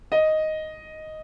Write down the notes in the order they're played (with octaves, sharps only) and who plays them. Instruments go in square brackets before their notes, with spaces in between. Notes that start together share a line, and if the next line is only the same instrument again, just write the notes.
[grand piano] D#5